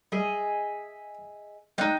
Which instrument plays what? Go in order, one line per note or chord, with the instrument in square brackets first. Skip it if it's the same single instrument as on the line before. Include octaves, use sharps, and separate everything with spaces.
[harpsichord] G3 [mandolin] G#4 D#5 E5
[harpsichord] G#3 D5 F5 [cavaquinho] D#4 G5 [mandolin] F#6